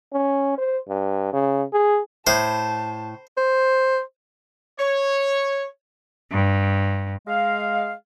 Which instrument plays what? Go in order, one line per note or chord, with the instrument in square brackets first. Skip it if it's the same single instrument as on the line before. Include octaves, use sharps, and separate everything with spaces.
[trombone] C#4
C5
G2
C#3
G#4
[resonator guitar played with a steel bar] A2 [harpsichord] C5 [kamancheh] A5
[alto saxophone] C5
[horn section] C#5
[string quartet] G2
[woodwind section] G#3 F5